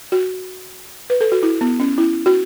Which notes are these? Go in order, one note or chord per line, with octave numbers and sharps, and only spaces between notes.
F#4
B4
A4
F#4
E4
B3
C#4
E4
F#4